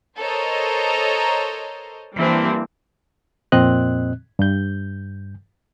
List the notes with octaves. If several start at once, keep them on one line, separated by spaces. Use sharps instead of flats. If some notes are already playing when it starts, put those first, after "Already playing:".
A4 A#4 C5 C#5 D#5 A#5
E3 G3 A#3 C4 D4
F2 A#2 C4 D#5 F#6
G2 G6